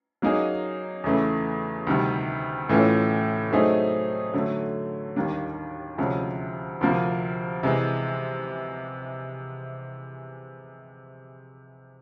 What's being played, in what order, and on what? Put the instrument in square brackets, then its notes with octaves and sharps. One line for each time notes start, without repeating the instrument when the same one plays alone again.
[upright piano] F#3 A#3 D#4 G#4
E2 C#3 E3 A3
D2 C3 D#3 G3
A2 E3 A3 C#4 F4
F#3 A3 C4 D#4 G#4
D3 F#3 A3
D#2 D#3 G3 A#3 D4
D2 C3 F3 G#3 C#4
D2 C3 F3 A#3
C3 E3 G#3